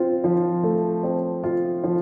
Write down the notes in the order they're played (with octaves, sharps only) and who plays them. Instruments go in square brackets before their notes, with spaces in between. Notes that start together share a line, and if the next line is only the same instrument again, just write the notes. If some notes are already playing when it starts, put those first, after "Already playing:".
Already playing: [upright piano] C4 F4
F3
A3
C4
F4
F3